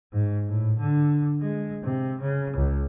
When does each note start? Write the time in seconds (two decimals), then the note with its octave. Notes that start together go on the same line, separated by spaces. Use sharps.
0.13 G#2
0.47 A2
0.79 D3
1.41 G#3
1.84 C3
2.21 C#3
2.57 C#2